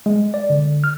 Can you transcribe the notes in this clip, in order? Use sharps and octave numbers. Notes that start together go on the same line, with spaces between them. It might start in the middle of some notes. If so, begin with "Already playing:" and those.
G#3
D5
D3
F6